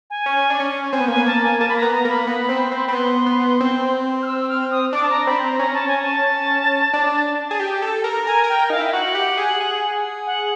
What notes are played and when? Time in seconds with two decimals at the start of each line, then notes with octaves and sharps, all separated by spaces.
0.10 G#5
0.26 C#4
0.50 D4
0.60 C#4
0.93 C4 G#5
1.00 B3
1.08 A#3 G#5
1.16 B3
1.26 A#3 A5
1.43 G#5
1.60 A#3 A5
1.69 B5
1.77 A#5
1.82 B3
1.93 A#5
2.05 A#3 B5
2.27 B3
2.49 C4
2.71 C4
2.87 C4 B5
2.93 B3 C6
3.26 B3
3.60 C4
4.22 F6
4.26 E6
4.41 E6
4.49 F6
4.71 D#6
4.93 D4 D6
5.03 A5
5.10 A#5
5.27 C4 B5
5.44 A#5
5.59 C#4 A#5
5.74 A5
5.88 G#5
6.02 A5
6.93 D4
7.51 G#4
7.60 G4
7.82 A4
8.04 A#4
8.27 A#4 G#5
8.44 A#4
8.49 G5
8.59 A#4
8.70 D#4 F5
8.77 E4
8.84 G5
8.93 F#4 F#5
9.15 G4
9.37 G#4
9.60 G#4
10.27 F#5